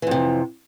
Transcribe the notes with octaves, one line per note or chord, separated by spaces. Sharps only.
F2 C3 E3